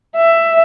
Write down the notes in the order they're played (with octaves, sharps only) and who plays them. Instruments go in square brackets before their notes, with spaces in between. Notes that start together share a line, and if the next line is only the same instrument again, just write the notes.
[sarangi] E5